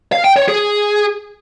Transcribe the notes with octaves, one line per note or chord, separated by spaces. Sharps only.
F5
G5
C#5
G#4